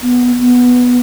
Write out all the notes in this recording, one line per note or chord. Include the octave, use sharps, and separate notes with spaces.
B3
B3